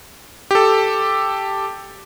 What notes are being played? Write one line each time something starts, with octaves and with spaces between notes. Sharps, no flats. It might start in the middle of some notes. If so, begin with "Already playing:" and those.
G4 A4